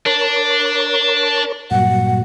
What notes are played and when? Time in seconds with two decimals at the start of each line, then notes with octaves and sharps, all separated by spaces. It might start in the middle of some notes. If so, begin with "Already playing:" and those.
0.06 D4 A#4 C#5
1.71 G2 A#2 F#3 F#5